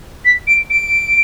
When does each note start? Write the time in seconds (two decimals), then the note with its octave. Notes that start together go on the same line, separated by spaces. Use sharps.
0.25 B6
0.47 D7
0.70 D7